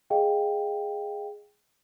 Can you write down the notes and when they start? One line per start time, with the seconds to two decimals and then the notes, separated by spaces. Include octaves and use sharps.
0.10 G#4 D#5 F5 G5